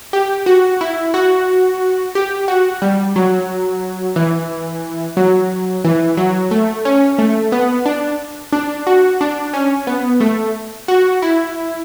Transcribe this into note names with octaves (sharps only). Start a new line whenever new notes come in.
G4
F#4
E4
F#4
G4
F#4
G3
F#3
E3
F#3
E3
F#3
A3
C#4
A3
B3
D4
D4
F#4
D4
C#4
B3
A3
F#4
E4